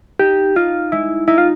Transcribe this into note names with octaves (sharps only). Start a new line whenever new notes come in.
D#4 G4
D#4 F4
G#3 E4
D#4 E4
F4